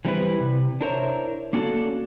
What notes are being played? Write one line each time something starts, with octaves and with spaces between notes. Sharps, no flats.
E3 G3 C4 D#4 E4 B4
C3
D4 E4 A#4 C5 C#5 E5
A#3 C#4 D4 F#4 G#4 A4